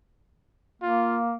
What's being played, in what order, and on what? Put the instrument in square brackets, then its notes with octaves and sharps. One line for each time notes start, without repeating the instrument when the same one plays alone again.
[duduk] A#3 [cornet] F4